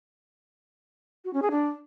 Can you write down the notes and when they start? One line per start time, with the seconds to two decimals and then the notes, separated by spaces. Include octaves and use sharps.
1.25 F#4
1.33 C#4
1.42 G#4
1.51 D4